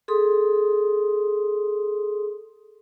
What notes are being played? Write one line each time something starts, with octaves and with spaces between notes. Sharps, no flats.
G#4 A4 C6 D#6